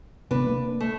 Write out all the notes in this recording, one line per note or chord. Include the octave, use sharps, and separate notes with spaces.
G#1 C3 B3 D4 B4
A#3
A3